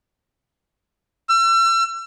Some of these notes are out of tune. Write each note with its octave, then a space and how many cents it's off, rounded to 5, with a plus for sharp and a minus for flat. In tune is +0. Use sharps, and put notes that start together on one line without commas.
E6 +40